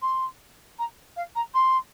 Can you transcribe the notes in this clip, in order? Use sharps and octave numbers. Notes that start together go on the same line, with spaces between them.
C6
A#5
F5
A#5
C6